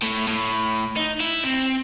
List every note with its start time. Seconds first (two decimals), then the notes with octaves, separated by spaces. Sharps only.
0.02 A2
0.27 A2
0.97 D#4
1.21 E4
1.44 C4